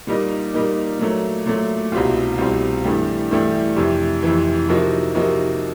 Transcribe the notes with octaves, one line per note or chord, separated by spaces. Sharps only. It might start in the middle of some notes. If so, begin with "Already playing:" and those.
A#2 G3 A#3 D#4
A#2 G3 A#3 D#4
A#2 F#3 A3
A#2 F#3 A3
C2 B2 G3 C4 F4
C2 B2 G3 C4 F4
G2 E3 A3 D4 G4
G2 E3 A3 D4 G4
F2 C3 E3
F2 C3 E3
C3 F3 A#3 D#4 F#4
C3 F3 A#3 D#4 F#4